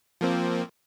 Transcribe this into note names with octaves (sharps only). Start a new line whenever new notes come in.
F3 A#3 C4